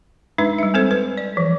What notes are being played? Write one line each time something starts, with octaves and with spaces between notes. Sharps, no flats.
G#3 D4 D#4 B4
G3 E5
C4 A4 C5
B4
D5
E3 F3